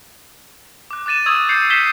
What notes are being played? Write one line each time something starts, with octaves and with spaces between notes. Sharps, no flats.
D6 F#6
D6 F#6 A6 D#7 E7
C#6 D#6 E6 G#6
D#6 G6 C7 C#7
G6 B6 C7 E7 G7